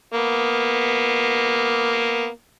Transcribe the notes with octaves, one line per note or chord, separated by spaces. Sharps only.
A#3 B3